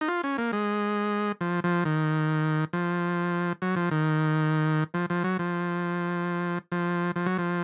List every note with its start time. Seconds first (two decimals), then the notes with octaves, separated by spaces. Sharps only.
0.01 D#4
0.08 F4
0.24 C#4
0.38 A#3
0.53 G#3
1.41 F3
1.64 F3
1.85 D#3
2.73 F3
3.62 F#3
3.76 F3
3.91 D#3
4.94 F3
5.10 F3
5.24 F#3
5.39 F3
6.72 F3
7.16 F3
7.26 F#3
7.38 F3